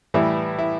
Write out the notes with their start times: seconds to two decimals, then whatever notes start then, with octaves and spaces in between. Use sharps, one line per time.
0.14 A2 E3 G3 E4
0.59 E4